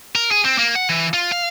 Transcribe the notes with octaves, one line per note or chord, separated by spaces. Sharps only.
A#4
G#4
C4
A#3
F#5
E3
F4
F5